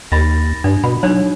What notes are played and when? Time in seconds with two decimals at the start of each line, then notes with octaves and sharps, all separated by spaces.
0.12 D#2 B5 A6 A#6
0.64 G2 D4
0.84 B2 B5
1.03 F#3 D4 D#4 C#5